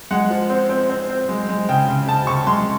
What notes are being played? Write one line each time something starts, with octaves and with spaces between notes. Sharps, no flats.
G#3 F#5
F3
C4
C4
C4
C4
G#3
G#3
C#3 G5
C#3
C#3 A5
C#3 C#6
G#3 C6